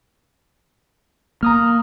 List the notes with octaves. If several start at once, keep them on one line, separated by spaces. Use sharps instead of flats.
A#3 A#5 D#6 F6